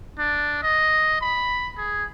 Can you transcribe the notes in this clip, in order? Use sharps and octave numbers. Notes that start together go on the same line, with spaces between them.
D4
D#5
B5
G#4